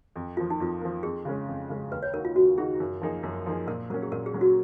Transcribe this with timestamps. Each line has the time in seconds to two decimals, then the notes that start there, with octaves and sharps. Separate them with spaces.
0.16 F2
0.37 F3 A#3 F4
0.50 D#4
0.60 F2 F4
0.81 F3 A#3
1.03 F2 G#4
1.25 C#3 G#3 C#4 G#4
1.48 F2
1.69 C#3 G#3 C#4 G#4
1.92 D#2 B4
2.03 C#5
2.14 D#3 A#3 D#4 F#4 A#4
2.25 F4
2.35 D#2 F#4
2.58 D#3 A#3 D#4 F#4 G#4
2.80 F#2
3.01 F3 A#3 D#4 G#4
3.23 F#2
3.46 F3 A#3 D#4 G#4
3.67 A#2 A#4
3.90 F#3 A#3 C#4 A#4
4.03 G#4
4.12 A#2 A#4
4.26 G#4
4.34 F#3 A#3 C#4
4.41 F#4